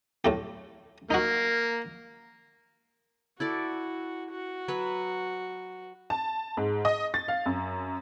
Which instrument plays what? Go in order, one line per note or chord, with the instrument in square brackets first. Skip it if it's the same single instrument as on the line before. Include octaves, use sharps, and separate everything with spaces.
[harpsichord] A2 A3 G4
[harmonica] A#3 [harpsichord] D#4 F#4
[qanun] E4 A4 D5 [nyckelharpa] F#4
[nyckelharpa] F#4
[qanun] F#3 B4
[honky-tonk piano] A5
G#2
D#5
A6
F5
F#2